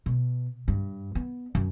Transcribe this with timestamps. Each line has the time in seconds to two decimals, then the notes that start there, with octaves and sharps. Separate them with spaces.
0.06 B2
0.68 G2
1.15 B3
1.55 F#2